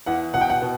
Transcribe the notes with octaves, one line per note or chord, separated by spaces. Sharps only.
E2 F#5
B2 F#5
G5
F#5
B2